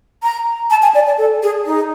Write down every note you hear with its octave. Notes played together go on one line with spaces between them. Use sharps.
A#5
A5
G#5
D5
D5
A4
G#4
D#4